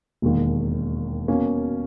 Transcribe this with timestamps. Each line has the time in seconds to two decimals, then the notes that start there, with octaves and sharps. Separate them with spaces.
0.22 E1 D#2 D#3
1.28 B2 A#3 C#4